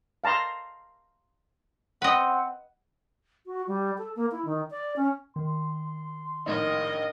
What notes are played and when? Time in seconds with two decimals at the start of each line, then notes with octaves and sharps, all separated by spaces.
0.24 F5 A5 A#5 C6
2.02 C4 B4 D#5 F#5
3.46 F#4
3.67 G3
3.98 A4
4.16 A#3
4.32 E4
4.45 D#3
4.71 D5
4.96 C#4
5.36 D#3 C6
6.46 A#1 A2 D#4 A#4 D#5